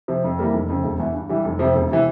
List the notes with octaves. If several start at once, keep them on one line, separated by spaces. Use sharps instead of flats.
C3 F3
F2
E3 G3 A#3
F1
F2 C#3
E1
E2 E3
G2
E3 G3
F1
F2 C3 F3
E1
C3 E3